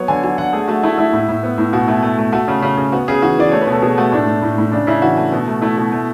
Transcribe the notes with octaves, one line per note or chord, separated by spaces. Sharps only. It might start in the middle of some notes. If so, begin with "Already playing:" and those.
Already playing: F#3 B3 C#5
D3 G#5
F#3 G#5
D3 F#5
A3 G#4
A3 F#4
A3 E4
A3 E4
A2
A2
B3
A2
B2 F#4
A3 E4
A3
A3
A3 F#4
C#3
C#3
C#3
B3 F#4
C#3 G#4
E3 F#4
E3 D5
A3 C#5
B4
B2
A4
B2 G#4
A3 F#4
A2 D4
A2
A2
A2
C#3 D4
C#3 E4
E3 F#4
A3
B2
A3
A3 E4
B2
A3